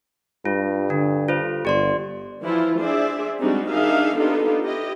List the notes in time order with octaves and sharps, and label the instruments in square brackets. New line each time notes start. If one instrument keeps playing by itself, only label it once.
[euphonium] G2 [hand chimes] F4
[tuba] D3 [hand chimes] D4
[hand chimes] F4 A4 C5
[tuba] G1 [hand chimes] G4 D5 C6
[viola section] E3 F3 E4 F4
D4 G#4 C5 D5 E5
G3 G#3 C4 D4 D#4 F#4
D#3 D4 D#4 G#4 E5 F5
B3 D4 D#4 F4 G4 A4
E4 G4 D#5